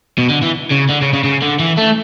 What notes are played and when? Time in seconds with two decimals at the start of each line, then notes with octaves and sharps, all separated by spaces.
0.18 B2
0.29 D3
0.42 E3
0.71 C#3
0.89 D3
1.01 C#3
1.13 C#3
1.24 C#3
1.42 D3
1.59 E3
1.78 A3